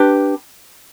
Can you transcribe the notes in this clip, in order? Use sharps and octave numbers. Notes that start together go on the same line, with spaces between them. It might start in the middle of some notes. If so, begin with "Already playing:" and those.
Already playing: D4 G4 B4